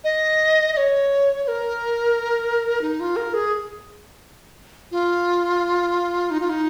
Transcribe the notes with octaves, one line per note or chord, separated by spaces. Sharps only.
D#5
D#5
C#5
C#5
A#4
D#4
F4
A#4
G#4
F4
D#4
F4
D#4